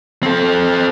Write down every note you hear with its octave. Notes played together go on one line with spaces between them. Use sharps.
C4 A4